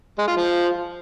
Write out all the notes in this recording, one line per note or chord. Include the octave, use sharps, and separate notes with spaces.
G#3
F4
F3